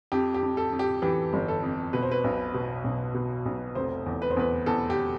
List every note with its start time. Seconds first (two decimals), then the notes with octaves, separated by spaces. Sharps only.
0.12 F2 G4
0.34 G4
0.43 F2
0.57 A4
0.73 F2
0.79 G4
1.02 E3 G4
1.33 G1
1.48 A4
1.63 F2
1.93 B2 B4
2.02 C5
2.11 B4
2.24 B1
2.54 B2
2.84 B1
3.14 B2
3.46 B1
3.75 F1 C5
4.06 E2
4.22 B4
4.31 C5
4.37 E2 B4
4.66 E2 A4
4.90 G4